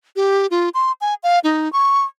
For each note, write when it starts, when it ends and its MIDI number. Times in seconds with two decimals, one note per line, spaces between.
0.16 0.47 67
0.51 0.69 65
0.74 0.92 84
1.01 1.14 80
1.23 1.39 77
1.44 1.71 63
1.73 2.04 85